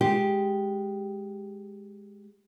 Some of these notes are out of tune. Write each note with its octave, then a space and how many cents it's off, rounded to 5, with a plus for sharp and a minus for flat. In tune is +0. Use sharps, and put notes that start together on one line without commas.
G#3 +0 G4 +0